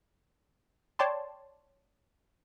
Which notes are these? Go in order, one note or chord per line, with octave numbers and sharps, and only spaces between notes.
C#5 D5 G5 A5 C6